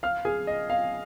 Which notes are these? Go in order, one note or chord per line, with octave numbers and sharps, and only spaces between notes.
F5 F6
G#4 G#5
D#5
F5